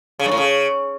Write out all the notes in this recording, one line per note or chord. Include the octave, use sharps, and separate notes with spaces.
C#3
G2
A2
C#3